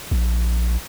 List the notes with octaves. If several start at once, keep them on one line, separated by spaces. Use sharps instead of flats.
A#1